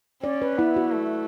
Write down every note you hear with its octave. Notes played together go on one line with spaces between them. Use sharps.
C#4 D5
B4
B3 E4
F#4
A3